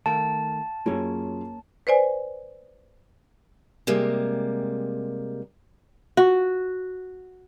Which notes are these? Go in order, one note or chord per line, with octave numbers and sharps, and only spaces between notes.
D#3 A3 A#4 F5 A5
F#2 A#3 C#4 F4 G#4 C#5
B4 C5 D5 G#5
C3 G3 G#3 A#3
F#4